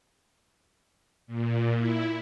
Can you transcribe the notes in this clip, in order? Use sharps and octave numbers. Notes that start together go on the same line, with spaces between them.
A#2
E4